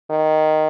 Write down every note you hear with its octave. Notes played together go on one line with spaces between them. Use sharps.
D#3